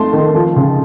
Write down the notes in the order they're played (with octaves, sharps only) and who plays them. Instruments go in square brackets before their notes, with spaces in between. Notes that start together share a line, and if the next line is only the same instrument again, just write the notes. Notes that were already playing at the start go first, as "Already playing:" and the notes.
Already playing: [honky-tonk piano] F2 A3 D#4 A5 C6
D#3
F3
C#3